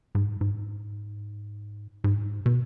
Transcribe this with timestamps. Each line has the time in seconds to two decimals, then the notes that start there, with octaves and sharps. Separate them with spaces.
0.15 G#2
0.41 G#2
2.04 G#2
2.46 B2